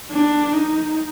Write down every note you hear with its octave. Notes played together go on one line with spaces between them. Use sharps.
D4
D#4